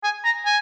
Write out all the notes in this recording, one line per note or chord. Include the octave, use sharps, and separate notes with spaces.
G#5
A#5
G#5